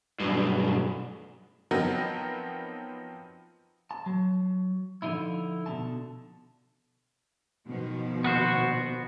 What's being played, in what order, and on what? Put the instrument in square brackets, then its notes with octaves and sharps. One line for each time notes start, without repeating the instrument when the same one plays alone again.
[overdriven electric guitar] B1 G2
[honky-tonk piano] F3 F#3 B3 C4 D#4 A#4
[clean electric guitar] A5
F#3
D3 F3 D#4 E4
B2 D3 A5
[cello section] B2 D#3 F3
[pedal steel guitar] B3 F#4 C5